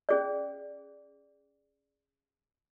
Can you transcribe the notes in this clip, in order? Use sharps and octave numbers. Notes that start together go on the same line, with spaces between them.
C#4 G#4 D5